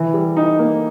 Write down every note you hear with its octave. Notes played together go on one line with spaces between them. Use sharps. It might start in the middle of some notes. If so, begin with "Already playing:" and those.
Already playing: E3
G3
D#4
A#3